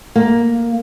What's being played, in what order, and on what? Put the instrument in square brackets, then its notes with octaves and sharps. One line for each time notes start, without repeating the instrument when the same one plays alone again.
[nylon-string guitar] A#3